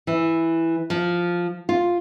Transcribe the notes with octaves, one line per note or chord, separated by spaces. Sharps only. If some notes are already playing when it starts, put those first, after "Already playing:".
E3
F3
F4